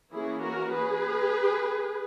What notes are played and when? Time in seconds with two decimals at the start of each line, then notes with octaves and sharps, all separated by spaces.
0.11 E3 A#3 C#4 E4 G#4
0.41 F#4 A#4
0.71 G#4 B4